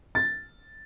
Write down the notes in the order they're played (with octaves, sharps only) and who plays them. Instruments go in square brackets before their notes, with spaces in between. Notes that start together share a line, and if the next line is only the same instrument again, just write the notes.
[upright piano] A6